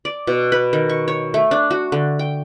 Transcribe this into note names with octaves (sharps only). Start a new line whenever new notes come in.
D5
B2
B4
D#3
C#6
C#5
A3
D4
F#4
D3
G5